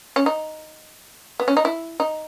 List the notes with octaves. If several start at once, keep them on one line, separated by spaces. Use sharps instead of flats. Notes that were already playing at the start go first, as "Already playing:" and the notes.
C#4
D#4
B3
C#4
D#4
E4
D#4